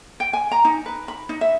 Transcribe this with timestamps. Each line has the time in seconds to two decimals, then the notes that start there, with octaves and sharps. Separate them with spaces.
0.20 G5
0.33 G#5
0.51 A#5
0.65 D#4
0.86 B4
1.08 B5
1.29 D#4
1.41 E5